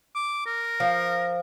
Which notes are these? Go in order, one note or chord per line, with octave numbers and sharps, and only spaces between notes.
D6
A#4
F3